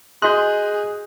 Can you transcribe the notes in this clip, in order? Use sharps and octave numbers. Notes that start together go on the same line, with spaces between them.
F#4 G#4 D#5 C6 F#6 G6